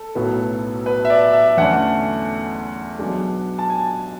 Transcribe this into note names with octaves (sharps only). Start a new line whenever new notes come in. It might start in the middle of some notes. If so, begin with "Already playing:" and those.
Already playing: A4
B1 A2 F#3 B3
B4
E5
D5
E5
E2 D3 A3 C#4 F#5
B1 B2 G#3 D4
A5
G#5